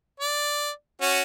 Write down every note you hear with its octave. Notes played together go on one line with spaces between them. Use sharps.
D5
C#4 F#4